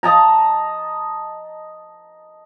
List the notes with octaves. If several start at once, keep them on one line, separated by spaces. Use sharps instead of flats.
D#5 A5 A#5